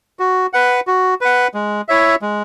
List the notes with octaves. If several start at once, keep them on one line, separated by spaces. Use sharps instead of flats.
F#4
B4 F#5
F#4
B4 F#5
G#3
E4 C#5 E5
G#3